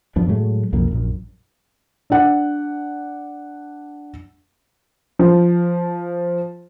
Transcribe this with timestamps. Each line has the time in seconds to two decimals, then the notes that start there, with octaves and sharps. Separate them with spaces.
0.16 F#2 F3 B3 D4
0.28 A2 F#3 G#3 A3
0.73 B1 F2 C#3 A#3
0.91 A#1 F#2
2.10 D4 F#5
5.19 F3